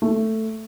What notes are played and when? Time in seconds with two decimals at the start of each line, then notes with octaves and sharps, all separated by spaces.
0.02 A3